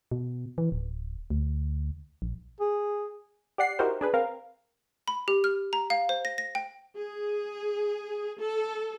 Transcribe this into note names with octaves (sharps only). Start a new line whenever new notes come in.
B2
E3
D1
D2
A#1
G#4
G4 D5 F#5 C7
D#4 E4 F#4 G4 A#4 C5
D4 G#4 B4
C4 A#4 F5
B5
G4
F6
A#5
F5
C5
A#6
A#6
G5
G#4
A4